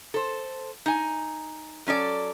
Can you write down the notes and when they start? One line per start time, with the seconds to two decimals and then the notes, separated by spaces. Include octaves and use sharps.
0.14 A4 C5
0.86 D#4 G#5
1.87 F#3 C#4 A4 D5